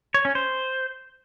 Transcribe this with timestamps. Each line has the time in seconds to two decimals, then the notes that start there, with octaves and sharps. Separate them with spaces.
0.14 C#5
0.25 C#4
0.35 C5